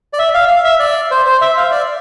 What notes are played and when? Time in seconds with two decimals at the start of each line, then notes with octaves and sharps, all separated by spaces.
0.13 D5
0.19 E5
0.34 F5
0.49 F5
0.65 E5
0.80 D5
1.11 C5
1.26 C5
1.41 E5
1.57 F5
1.71 D5